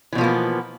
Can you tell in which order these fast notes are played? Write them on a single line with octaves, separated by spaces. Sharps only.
E3 B2 F3 A#3 B3